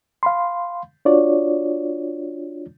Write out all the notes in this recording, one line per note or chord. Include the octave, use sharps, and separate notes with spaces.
F5 B5 C6
D4 F4 F#4 C#5 D5